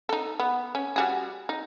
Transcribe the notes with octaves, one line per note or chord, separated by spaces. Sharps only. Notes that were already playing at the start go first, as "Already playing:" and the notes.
D#4 A4
B3
C#4
G3 F#4 G#4
D#4